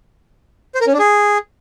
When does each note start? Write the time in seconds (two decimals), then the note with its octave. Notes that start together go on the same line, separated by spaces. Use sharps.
0.75 C5
0.81 A#4
0.87 C#4
0.93 D4
0.99 G#4